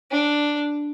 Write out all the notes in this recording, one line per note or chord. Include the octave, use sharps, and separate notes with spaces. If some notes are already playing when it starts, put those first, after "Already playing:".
D4